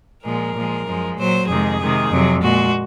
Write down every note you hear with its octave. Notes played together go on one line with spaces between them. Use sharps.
A#2 F3 G#3 A#4
A#2 F3 G#3
F#2 F3 G#3
A#2 F#3 C5
F2 C3 D#3 G#3 G#4
C3 D#3 G#3
F2 C3 F#3
A#2 G#3 F#4